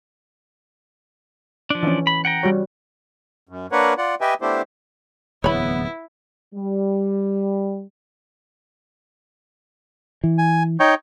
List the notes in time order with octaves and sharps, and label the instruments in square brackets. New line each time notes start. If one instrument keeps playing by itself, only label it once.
[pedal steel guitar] F3 D4
[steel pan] E3 C#4
[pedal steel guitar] B5
F#5 G5 A#5
[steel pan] G3 F#4 C#5
[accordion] F#2
A#3 D4 A#4 B4 C#5 F#5
F4 D5 F#5
G4 B4 D#5 E5 G5 G#5
A3 B3 D4 E4 G4 C5
[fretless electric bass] D1 E2 [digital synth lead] B3 [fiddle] E4 [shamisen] C#5 B5
[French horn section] G3
[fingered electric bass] E3
[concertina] G#5
D#4 C#5 G5